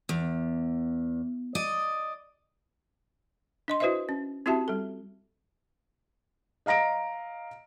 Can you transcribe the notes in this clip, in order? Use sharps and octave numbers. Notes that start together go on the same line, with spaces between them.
E2
D5 D#5
D4 D#5 C6
E4 F#4 B4 C5 D#5 E5
C#4
C4 E4 F#4 G4 E5 A5
G3 A4
D#5 F5 A#5 A#6 D7